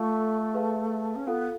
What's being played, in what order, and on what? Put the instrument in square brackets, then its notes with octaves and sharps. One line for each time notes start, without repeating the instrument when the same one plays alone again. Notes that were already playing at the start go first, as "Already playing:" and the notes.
Already playing: [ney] A3 [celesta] F4 A4 F5 A5 C#6
[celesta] G#4 B4 F5 A5
[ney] C#4
[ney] B3 [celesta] F4 A4 F5